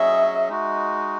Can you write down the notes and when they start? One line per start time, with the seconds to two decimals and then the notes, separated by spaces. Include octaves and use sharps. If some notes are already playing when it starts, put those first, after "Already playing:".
Already playing: F#3 C#4 G#4 D#5 E5
0.49 G#3 D#4 F#4